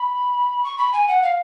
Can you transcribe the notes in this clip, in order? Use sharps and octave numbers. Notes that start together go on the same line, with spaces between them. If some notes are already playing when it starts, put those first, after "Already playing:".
Already playing: B5
C#6
B5
G#5
F#5
F5